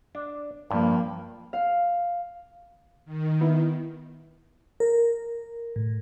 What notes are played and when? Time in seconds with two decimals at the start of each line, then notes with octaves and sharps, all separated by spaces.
0.15 D4
0.71 G2 F3 A#3
1.53 F5
3.05 D#3
3.41 B3 E4
4.80 A#4
5.76 A2